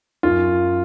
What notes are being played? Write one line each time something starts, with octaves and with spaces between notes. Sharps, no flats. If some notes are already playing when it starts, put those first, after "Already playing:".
F#2 F4